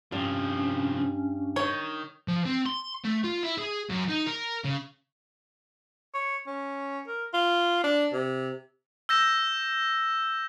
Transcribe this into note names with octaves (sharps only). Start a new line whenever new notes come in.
C2 G2 F3 C#4
D#3 C#5
F3
C4
C6
A3
F4
E4
G#4
F#2
D#4
A#4
C#3
C#5
C#4
A#4
F4
D4
C3
E6 G6 A#6 E7